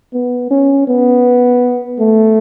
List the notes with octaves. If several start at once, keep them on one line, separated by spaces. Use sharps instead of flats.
B3
C#4
B3
A3